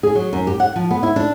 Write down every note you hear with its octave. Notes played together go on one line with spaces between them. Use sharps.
G#4
F#3
F#2
G4
F#5
F3
B3
E4
D4